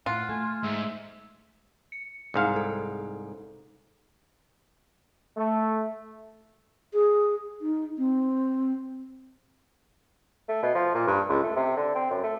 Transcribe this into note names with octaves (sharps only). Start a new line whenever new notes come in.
A2 F4 F#5
A3 G#5
G#2 E5
C#7
C2 G#2 F5
A4
A3
G#4
D#4
C4
A3
B2
F3
A#2
G2
C#2
A3
C3
D3
C4
F#2
A3